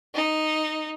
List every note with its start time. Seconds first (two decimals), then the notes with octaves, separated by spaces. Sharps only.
0.15 D#4